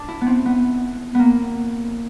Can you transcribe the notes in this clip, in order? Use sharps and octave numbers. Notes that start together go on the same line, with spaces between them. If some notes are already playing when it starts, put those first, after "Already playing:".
Already playing: D4
E4
B3
C4
B3
A#3 B3